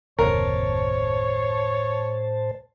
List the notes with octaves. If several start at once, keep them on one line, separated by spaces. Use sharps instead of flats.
F#1 D#2 A2 C3 A#4 C5 C#5 A5